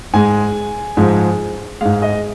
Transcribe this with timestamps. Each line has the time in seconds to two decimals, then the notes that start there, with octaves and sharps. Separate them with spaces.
0.13 G#2 G#3 G#5
0.97 G#2 F3 G#3
1.81 G#2 G#3 F5
2.02 D#5